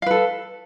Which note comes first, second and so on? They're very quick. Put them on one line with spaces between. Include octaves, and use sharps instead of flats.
F5 B4 A4